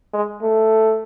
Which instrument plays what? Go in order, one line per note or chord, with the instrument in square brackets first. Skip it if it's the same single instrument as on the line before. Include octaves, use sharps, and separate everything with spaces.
[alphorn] G#3
A3